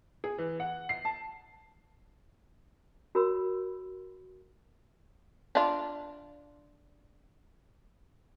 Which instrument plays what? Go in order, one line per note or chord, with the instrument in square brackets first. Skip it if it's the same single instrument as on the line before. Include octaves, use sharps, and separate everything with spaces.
[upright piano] G#4
E3
F#5
C7
A5
[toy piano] F#4 A#4 C#5 B5 E6
[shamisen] D4 F4